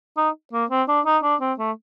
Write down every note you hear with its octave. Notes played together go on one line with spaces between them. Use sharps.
D#4
A#3
C4
D4
D#4
D4
C4
A3